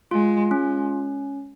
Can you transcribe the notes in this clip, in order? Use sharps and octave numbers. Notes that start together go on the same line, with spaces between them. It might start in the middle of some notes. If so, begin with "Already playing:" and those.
G#3 F4
G#3 C#4